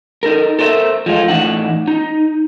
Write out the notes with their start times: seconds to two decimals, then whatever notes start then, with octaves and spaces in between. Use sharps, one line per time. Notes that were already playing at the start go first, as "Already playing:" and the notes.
0.23 D#4 A4 A#4
0.59 A4 A#4 C5 D5 E5
1.06 F3 G#3 F4 A4
1.28 A2 E3 C4 D4 D#4 F#5
1.88 D#4